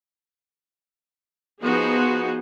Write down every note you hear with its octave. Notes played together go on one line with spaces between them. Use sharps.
F3 B3 D#4 F#4 G#4 C5